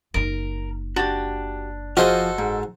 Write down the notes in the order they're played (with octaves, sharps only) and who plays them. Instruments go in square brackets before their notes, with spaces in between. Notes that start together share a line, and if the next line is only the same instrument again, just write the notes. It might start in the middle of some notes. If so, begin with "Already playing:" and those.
[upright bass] F#1 D#4 [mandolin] A#4
[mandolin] D4 [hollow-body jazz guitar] F#4 G4
[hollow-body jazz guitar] F3 G#4 [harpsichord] F#4 C5 [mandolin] A4 D#5 F6
[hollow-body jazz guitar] G#2